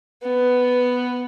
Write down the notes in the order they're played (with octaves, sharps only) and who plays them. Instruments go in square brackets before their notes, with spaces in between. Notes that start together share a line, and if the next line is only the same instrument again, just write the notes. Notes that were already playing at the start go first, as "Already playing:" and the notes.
[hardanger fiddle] B3